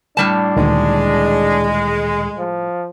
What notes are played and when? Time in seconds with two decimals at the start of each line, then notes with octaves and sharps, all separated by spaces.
0.17 A2 G3 D4 A5
0.57 D2 A#2 D#3 G#3
2.38 F3